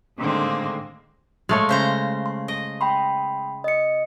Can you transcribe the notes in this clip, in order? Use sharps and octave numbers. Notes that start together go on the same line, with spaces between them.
A2 D3 D#3 G#3 A#3 C4
G#3 A3 C#5 F5
C#3 C5 A#5
C6
D#5
G5 B5 C6
D#5 C#7